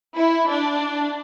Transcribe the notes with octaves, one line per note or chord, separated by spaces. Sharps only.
E4
D4